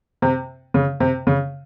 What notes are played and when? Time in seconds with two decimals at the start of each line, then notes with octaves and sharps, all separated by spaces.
0.22 C3
0.74 C#3
1.00 C3
1.27 C#3